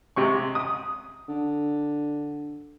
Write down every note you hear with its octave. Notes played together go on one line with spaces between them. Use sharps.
C3 G#3 C#6
D#6
D3